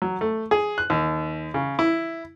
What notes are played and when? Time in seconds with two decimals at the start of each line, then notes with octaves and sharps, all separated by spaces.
0.02 F#3
0.21 A3
0.51 G#4
0.78 F#6
0.90 D#2
1.54 C#3
1.79 E4